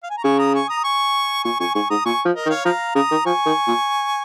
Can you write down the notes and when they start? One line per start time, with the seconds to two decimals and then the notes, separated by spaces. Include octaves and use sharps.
0.03 F5
0.10 G#5
0.17 A#5
0.23 C#3 G#5 C#6
0.39 A#5 D#6
0.54 G#5 C#6
0.69 A#5 D#6
0.84 G#5 C#6
1.44 A#2 G#5 C#6
1.60 F2 G#5 C#6
1.74 G#2 G#5 C#6
1.90 G#2 A#5 D#6
2.05 A#2 G#5 C#6
2.25 F3
2.35 A#4 D#5
2.46 D#3
2.50 C#5 F5
2.65 F3 F5 A#5
2.95 C#3 A#5 D#6
3.11 D#3
3.25 F3 G#5 C#6
3.46 D#3
3.67 A#2